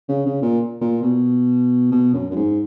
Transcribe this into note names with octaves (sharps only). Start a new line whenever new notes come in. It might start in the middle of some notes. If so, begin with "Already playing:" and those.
C#3
C#3
A#2
A#2
B2
B2
F#2
F#2
G#2